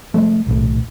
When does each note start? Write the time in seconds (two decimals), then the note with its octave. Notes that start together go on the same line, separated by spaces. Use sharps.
0.14 C3 F3 G#3 A3
0.47 D#1 B1 A2